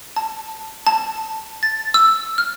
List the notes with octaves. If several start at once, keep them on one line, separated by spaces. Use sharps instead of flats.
A5
A5
A6
E6
F6